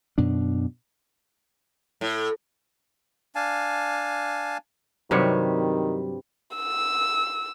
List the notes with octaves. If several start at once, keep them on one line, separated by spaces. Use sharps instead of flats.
F#2 B2 D4
A2
D4 F5 G#5 A5
G2 C3 D#3 F#3 G3 C4 G#6 C#7
E6